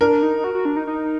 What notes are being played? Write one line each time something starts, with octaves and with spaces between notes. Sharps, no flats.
D4 A#4
D#4
F#4
F#4
D4
D#4
D#4